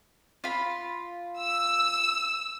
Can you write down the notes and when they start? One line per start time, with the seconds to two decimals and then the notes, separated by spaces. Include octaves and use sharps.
0.44 F4 B5
1.38 E6